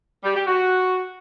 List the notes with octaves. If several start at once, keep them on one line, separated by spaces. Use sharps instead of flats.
G3
G4
F#4